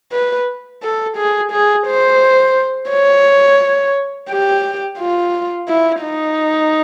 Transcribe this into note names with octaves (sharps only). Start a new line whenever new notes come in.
B4
A4
G#4
G#4
C5
C#5
G4
F4
E4
D#4